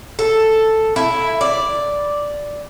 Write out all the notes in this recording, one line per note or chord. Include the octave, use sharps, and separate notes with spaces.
A4
E4
D5